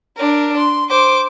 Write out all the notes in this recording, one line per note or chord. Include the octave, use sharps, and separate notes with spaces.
D4 A#4
C6
C5 D6